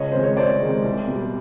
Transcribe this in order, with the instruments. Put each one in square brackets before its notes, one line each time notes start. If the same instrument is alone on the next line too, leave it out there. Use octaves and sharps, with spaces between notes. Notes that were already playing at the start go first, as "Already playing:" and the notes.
Already playing: [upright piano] C#2 C#5 D#5
C3 D#3 G#3 C5
C#5
C#2 C5 D5
C3 D#3 G#3
C2
B2
G3